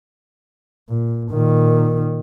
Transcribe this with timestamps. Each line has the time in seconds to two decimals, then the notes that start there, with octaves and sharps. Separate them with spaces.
0.89 A#2
1.31 A#2 D#3